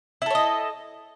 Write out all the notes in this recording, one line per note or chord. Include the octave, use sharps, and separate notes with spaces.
E4 A4 C#5 D#5